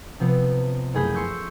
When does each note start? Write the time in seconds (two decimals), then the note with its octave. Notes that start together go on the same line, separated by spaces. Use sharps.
0.20 C3 F3 B3
0.94 F#1 A3 G#4 B5 G6 B6
1.14 C6 C#6 E6 G6